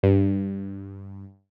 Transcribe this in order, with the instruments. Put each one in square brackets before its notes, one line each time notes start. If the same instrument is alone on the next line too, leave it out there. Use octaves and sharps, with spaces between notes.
[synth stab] G2